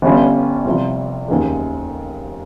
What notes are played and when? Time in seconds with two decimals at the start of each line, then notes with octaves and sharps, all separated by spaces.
0.02 G1 G2 G3 C#4 F4
0.65 C2 C3 F3 C4 F4
1.28 F1 D#2 C#3 F3 G#3